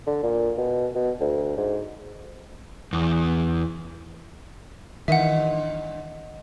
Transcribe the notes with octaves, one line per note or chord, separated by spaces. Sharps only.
D3
A#2
B2
B2
D2
G#2
E2
G2 A#2 D#3 E3 D#5 E5 F#5